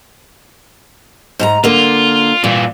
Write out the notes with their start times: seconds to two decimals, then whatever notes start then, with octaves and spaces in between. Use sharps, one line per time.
1.40 G#2 A5 A#5
1.64 D3 A#3 F4
2.44 G2 A#2 E3